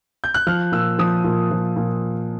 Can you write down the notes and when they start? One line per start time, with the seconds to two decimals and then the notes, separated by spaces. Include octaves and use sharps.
0.24 G6
0.34 F#6
0.47 F3 F6
0.72 A#2 E6
0.99 F3 D#6
1.24 A#2
1.51 F3
1.76 A#2